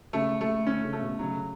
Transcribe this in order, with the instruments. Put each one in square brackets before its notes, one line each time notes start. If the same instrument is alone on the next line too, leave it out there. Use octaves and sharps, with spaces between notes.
[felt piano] C#3 [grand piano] A3
[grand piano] A3
[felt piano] D3 [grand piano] C#4
[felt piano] C#3
[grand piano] A3
[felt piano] B2
[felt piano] C#3 [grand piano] F#3